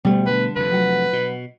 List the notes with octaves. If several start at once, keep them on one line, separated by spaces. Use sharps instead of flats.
D2 B2 G3 A3
D3 B4
F1 F2 B4
F#3 F#5
B2